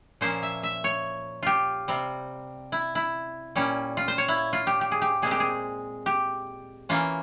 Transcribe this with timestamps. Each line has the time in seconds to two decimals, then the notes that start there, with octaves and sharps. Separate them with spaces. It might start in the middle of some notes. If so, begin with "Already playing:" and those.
0.21 A#2 F3 A#3 C#4 C5
0.42 E5
0.63 E5
0.84 C#5
1.43 F4 G4
1.88 C3 G3 C4
2.72 E4
2.95 E4
3.56 A#2 G3 C#4
3.97 F4
4.08 C5
4.18 C#5
4.28 E4
4.53 F4
4.67 G4
4.81 G4
4.91 G#4
5.02 G4
5.22 A#2 G#3 C4 G#4
5.31 G4
5.40 G#4
6.06 G4
6.89 E3 A#3 C#4 F4